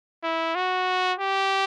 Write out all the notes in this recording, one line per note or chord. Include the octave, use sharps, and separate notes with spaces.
E4
F#4
G4